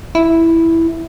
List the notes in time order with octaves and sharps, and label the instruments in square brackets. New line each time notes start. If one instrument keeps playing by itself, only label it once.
[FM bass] E4